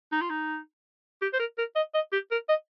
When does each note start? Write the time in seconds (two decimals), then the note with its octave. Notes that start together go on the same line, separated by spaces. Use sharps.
0.12 D#4
0.21 F4
0.30 D#4
1.22 G4
1.33 C5
1.39 A#4
1.58 A#4
1.76 D#5
1.94 D#5
2.13 G4
2.31 A#4
2.49 D#5